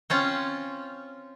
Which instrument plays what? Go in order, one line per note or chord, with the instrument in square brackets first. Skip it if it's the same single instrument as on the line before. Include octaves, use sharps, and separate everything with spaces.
[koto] C4 C#4 F4